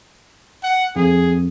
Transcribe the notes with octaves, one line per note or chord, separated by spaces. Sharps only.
F#5
F2 G#4